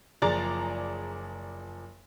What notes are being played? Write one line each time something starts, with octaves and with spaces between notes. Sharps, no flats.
F#1 F3 G#4 D5 A#5 A6